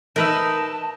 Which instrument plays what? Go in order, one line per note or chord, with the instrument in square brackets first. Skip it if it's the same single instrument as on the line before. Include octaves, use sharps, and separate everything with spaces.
[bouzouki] D#4 [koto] A#4 B4 E5 [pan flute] A5